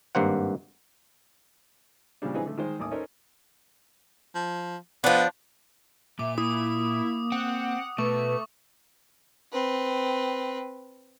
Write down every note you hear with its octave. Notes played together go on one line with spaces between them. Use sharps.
G#1 G2 A#3 C5 F#5
A#2 C#3 F3 G3 D4
E3 F3 C4 D#4 G#4 B4
D3 A3
D#3 G#3 C5
A1 D#2 D6 D#6
C#4 D#4 A4 A#4 C5 C#5
F3
F3 B3 D4
A#2 E5 D6
A#3 E4 D#6
C4 F#5
B2 A3 B4 C#6
C4 B4